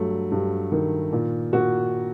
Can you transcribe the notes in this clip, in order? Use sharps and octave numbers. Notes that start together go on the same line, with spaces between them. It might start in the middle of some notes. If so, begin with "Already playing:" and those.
Already playing: G2 F#3 A3
G2
D#3
A#2
A#2 F#4